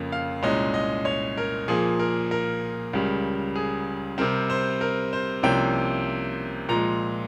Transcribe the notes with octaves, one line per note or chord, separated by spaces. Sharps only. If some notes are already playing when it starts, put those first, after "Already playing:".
Already playing: F2 C#3 F3 A#3
F5
C2 A#2 G#3 C#4 D#5
D#5
C#5
A#4
A#2 F3 A#3 G#4
A#4
A#4
C#2 C#3 G3
G#4
C3 G3 C4 A#4
C5
A#4
C5
C2 C3 F3 A#3 C#4 G5
A#2 F3 G#3 A#5